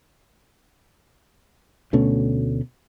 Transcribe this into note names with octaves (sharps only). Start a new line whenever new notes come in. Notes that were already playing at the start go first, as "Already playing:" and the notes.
D2 B2 A3 C#4